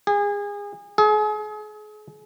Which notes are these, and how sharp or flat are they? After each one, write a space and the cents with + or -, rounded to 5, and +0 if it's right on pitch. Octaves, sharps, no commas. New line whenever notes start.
G#4 -30
G#4 +35